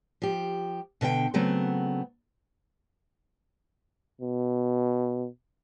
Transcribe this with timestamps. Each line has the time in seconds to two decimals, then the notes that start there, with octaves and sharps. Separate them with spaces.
0.22 F3 G4
1.01 B2 D3 D#5 G5
1.34 C#3 F#3 A3 B3 C4
4.21 B2